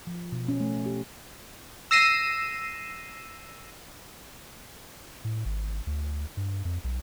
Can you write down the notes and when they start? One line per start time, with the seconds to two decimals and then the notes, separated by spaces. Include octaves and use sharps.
0.07 F3
0.32 B2
0.48 C#4
0.60 A3
0.86 G4
1.91 E6 A#6 C7 D#7 E7
5.24 A2
5.45 G#1
5.87 D2
6.37 G2
6.65 F2
6.84 B1